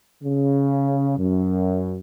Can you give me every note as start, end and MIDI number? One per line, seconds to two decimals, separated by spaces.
0.24 1.16 49
1.17 1.97 42